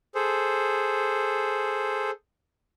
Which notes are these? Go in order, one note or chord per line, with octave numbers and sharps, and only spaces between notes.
G#4 A4 C5